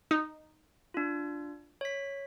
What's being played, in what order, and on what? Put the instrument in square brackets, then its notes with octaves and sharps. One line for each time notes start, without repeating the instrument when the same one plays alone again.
[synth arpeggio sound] D#4
[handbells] D4 F4
C#5 B6